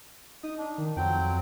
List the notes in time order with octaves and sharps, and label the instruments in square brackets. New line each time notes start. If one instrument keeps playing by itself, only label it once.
[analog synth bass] D#4 [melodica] D#6
[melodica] D4
[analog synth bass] D#3
[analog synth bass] F2 [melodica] F#3 C4 G5